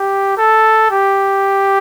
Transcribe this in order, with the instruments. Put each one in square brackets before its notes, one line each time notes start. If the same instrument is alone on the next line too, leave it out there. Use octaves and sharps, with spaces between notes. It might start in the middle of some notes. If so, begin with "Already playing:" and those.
Already playing: [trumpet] G4
A4
G4